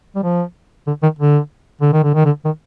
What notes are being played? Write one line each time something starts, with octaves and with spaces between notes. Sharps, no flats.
G3
F3
D3
D#3
D3
D3
D#3
D3
D#3
D3
D#3